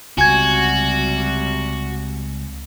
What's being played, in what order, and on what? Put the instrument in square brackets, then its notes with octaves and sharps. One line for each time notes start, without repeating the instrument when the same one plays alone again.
[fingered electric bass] C#2 [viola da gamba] C3 G3 [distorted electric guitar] F#4 [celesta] G#5 G#6